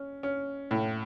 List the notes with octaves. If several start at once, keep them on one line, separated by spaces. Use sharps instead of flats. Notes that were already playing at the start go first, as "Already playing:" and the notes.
Already playing: C#4
C#4
A2